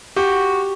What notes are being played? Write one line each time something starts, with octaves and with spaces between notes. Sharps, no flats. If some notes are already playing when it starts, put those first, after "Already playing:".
F#4 G4